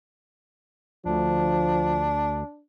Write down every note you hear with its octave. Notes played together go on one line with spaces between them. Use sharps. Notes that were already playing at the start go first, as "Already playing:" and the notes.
D2 F3 D4